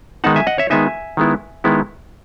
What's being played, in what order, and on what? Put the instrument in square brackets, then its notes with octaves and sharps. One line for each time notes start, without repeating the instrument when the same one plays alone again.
[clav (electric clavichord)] D#3 G#3 B3 D#4 F#5 A5
E5 G#5
D#5 F#5
C#5 E5
D#3 G#3 B3 D#4 E5 G#5
D#3 G#3 B3 E4
D#3 G#3 B3 E4